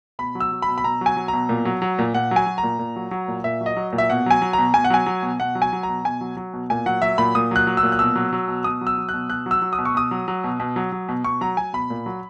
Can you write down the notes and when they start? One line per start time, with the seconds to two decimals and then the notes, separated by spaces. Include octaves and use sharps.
0.19 B2 B5
0.35 F#3
0.40 E6
0.52 F#3
0.62 B5
0.68 B2
0.78 B5
0.84 B2 A#5
1.01 F#3 G#5
1.17 F#3
1.28 B2 A#5
1.49 A#2
1.65 F#3
1.82 F#3
1.99 A#2
2.14 A#2 F#5
2.31 F#3 G#5
2.46 F#3
2.58 A#5
2.63 A#2
2.79 A#2
2.96 F#3
3.11 F#3
3.28 A#2
3.44 A#2 E5
3.61 F#3
3.66 D#5
3.77 F#3
3.93 A#2
3.98 E5
4.10 B2 F#5
4.26 F#3 G#5
4.42 F#3
4.53 A#5
4.58 B2
4.74 B2 G#5
4.84 F#5
4.90 F#3 G#5
5.06 F#3
5.23 B2
5.39 B2 F#5
5.55 F#3
5.62 G#5
5.73 F#3
5.83 A#5
5.89 B2
6.05 B2 G#5
6.21 F#3
6.37 F#3
6.53 B2
6.70 A#2 G#5
6.86 F#3 F#5
7.02 F#3 E5
7.18 A#2 B5
7.35 A#2 D#6
7.51 F#3 F#6
7.67 F#3
7.77 E6
7.83 A#2
7.92 F#6
7.99 B2 E6
8.15 F#3
8.33 F#3
8.48 B2
8.64 B2 D#6
8.81 F#3
8.87 E6
8.97 F#3
9.09 B2 F#6
9.29 B2 F#6
9.46 F#3
9.51 E6
9.62 F#3
9.73 D#6
9.78 B2
9.85 C#6
9.95 B2 D#6
10.11 F#3
10.28 F#3
10.44 B2
10.60 B2
10.76 F#3
10.92 F#3
11.09 B2
11.24 B2 C#6
11.41 F#3 A#5
11.57 F#3 G#5
11.73 B2 B5
11.90 A#2
12.06 F#3